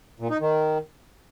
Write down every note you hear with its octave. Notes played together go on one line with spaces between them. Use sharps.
A#2
D#4
D#3